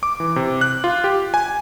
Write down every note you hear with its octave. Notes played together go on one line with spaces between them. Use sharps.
D6
E3
C3
F#6
F4
G4
G#5